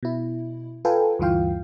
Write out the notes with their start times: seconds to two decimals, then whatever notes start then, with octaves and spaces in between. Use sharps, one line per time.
0.03 B2 E4
0.85 F4 A4 B4 F5 G5 G#5
1.19 D2 G2 E3 F4 F5 G5